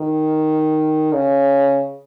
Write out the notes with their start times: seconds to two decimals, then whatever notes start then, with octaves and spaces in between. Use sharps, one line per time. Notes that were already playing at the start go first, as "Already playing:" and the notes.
Already playing: D#3
1.14 C#3